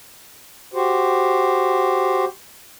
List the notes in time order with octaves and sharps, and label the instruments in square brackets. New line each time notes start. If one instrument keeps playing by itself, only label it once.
[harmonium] F#4 G4 C5